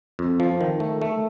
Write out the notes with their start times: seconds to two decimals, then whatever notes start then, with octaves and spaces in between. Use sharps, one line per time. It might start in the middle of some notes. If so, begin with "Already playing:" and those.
0.19 F2
0.40 F3
0.61 D#3
0.80 A3
1.01 A3